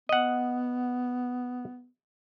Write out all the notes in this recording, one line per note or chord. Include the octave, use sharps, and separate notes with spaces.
B3 D#5 F#5